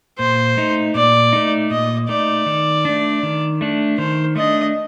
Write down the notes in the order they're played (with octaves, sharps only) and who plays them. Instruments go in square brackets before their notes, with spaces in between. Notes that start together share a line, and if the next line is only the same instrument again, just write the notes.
[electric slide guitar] A#2 [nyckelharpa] C5
[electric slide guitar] A3 D#4
[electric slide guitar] A#2 [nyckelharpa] D5
[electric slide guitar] A3 D#4
[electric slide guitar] A#2 [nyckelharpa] D#5
[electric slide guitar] A3 D#4 [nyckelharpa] D5
[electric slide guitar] D#3
A3 D4
D#3
A3 D4
[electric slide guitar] D#3 [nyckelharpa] C5
[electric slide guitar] A3 D4 [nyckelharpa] D#5